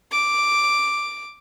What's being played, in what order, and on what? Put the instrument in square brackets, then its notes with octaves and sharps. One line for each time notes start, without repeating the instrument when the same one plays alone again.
[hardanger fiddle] D6